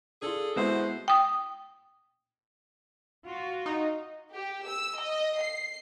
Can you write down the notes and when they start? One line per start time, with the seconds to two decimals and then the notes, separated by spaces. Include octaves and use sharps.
0.22 D4 F4 G#4 A4
0.56 B2 G#3 B3 E4 C5
1.08 G5 D#6
3.26 F4 F#4
3.66 D#4
4.33 G4
4.67 E6
4.98 D#5
5.39 C7